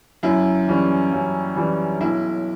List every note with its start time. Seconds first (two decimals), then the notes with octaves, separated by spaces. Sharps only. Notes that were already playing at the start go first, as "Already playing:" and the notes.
0.23 F#2 E4
0.67 E3 G3 C#4
1.12 F#2
1.56 E3 G3 C#4
2.00 B1 E4